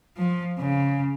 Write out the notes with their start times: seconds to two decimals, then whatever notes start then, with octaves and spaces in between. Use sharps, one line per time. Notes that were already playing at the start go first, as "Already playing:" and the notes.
0.17 F3
0.59 C#3